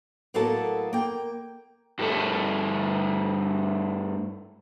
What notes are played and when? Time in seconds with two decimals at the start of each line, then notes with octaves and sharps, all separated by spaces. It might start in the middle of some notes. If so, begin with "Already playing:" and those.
0.34 A2 F#3 A#3 B3 A4 A5
0.93 A#3 G5
1.99 G2 A3